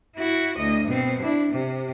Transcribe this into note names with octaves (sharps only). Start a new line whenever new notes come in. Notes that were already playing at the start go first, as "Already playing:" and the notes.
E4 F#4
D2 D#5
B2 C4
D4 E4
C3